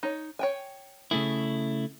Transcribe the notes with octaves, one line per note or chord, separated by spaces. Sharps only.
D#4 C#5
C#5 G5 G#5
C#3 A3 E4 G#4